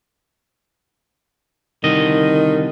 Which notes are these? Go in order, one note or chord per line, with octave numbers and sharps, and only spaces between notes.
C2 D3 D#3 D#5